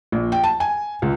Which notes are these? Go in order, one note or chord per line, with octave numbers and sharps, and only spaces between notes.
A#1
G5
A5
G#5
C#2